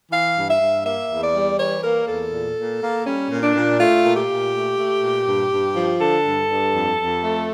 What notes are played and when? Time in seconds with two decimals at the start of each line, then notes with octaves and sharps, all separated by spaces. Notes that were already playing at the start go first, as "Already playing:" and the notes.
0.12 E3 F5
0.36 G2
0.49 E5
0.61 G2
0.85 A#3 E5
1.10 E2
1.22 D5
1.34 G3
1.58 E3 C#5
1.83 A#3 A#4
2.07 E2 A4
2.32 A#2
2.57 A#2
2.82 A#3
3.06 G3 C#4
3.31 A#2
3.43 D4
3.55 A#2
3.79 A3 F4
4.04 A#2
4.16 G4
4.29 A#2
4.54 A3
4.77 A3
5.03 A#2
5.27 G2
5.51 G2
5.76 F3
6.00 D3 A4
6.25 G2
6.49 G2
6.74 F2
6.99 F2
7.23 A3